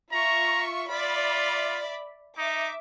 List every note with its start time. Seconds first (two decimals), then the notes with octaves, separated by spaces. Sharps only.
0.12 F4 E5 A#5 C#6
0.91 F4 D5 E5 B5
2.38 D#4 E5 D6